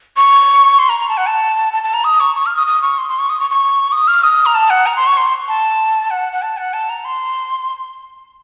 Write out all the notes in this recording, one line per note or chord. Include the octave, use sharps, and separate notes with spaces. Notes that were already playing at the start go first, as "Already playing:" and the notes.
C#6
C6
A#5
A#5
A5
F#5
A5
A5
A5
A#5
D#6
C#6
C#6
F6
D#6
D#6
C#6
C6
C6
C#6
D#6
C#6
C#6
D#6
F6
D#6
A#5
A5
F#5
A#5
C6
C#6
C6
A5
F#5
F#5
A5
F#5
A5
A#5
C6